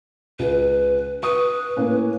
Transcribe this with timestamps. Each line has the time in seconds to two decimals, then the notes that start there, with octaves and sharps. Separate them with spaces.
0.39 C#2 B4
1.23 B4 C#6 D#6
1.77 A2 A#3 C#4